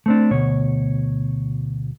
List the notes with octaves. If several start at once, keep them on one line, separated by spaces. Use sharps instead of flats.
A3 C4 D4
D2 B2 C#5